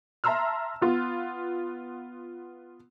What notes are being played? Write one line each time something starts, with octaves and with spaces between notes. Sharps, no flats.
E5 A5 A#5 C6 E6 F6
B3 F4